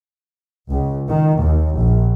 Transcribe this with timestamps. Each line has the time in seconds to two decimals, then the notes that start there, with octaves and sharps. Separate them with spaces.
0.71 C#2
1.10 D#3
1.41 D#2
1.79 A#1